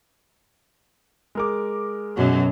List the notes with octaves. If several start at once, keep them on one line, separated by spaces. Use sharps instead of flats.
G#3 A#4 D6
F#2 B2 F#3